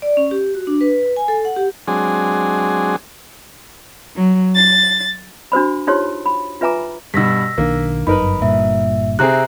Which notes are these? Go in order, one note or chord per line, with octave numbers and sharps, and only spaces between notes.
D5
C#4
G4
F#4
D4
B4
G#5
A4
F#5
G4
F#3 G#3 C4 D4 G#4
F#3
A6
D4 F#4 C5 B5
D#4 F4 G4 C5 C#5 C6
B5
F4 B4 E5 G#5 A#5 D6
G2 B2 E6 A#6 B6
B1 D#3 A#3 D4
G1 F#2 D#4 A#4 B4 B5
G1 G2 A#2 E5
C3 C4 G#4 E5 A#5 F#6